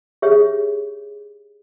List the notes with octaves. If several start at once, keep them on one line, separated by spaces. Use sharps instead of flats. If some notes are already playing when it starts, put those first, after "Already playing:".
G4 G#4 C#5 E5